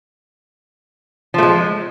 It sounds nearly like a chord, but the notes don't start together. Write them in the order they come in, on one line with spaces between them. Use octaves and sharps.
F3 A3 G#3